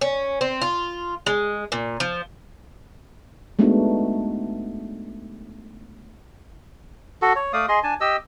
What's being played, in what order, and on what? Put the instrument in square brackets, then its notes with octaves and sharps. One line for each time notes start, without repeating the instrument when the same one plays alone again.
[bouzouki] C#4
C4
F4
G#3
A#2
F3
[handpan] G#3 A3 B3 D4 D#4 F#4
[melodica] F#4 A4
C#5
A3 D5 F5 D#6
G#4 D#5 C6
D4 G#5 A5
G4 D#5 E6